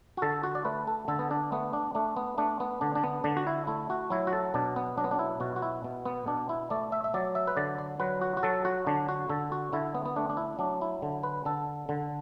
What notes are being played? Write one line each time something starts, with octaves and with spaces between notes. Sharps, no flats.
F#4
D3 A4
F#4
D5
A3 B4
A4
D3 A4
B3
D4
A3 B3
D4
A3 D4
B3
A3 D4
B3
D3 D4
D4
B3
D3 D4
F#4
E4
A3 E4
F#4
F#3 E4
F#4
A4
B2 D4
B3
F#3 D4
B3
D4
E4
B2 F#4
F#4
E4
B2
B3
B2 D4
E4
A3 D5
E5
E5
F#3 D5
E5
B4
D3 D5
D5
F#3 B4
F#4
F#4
F#3 A4
F#4
D3 D4
F#4
D3 A4
F#4
D3 E4
B3
B3
A3 D4
D4
E4
F#3 D4
E4
D3
B4
D3 A4
D3